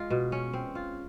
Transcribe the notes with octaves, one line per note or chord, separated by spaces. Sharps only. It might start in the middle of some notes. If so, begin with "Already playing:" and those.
Already playing: G#3 F4
B2
C#4
C4
F4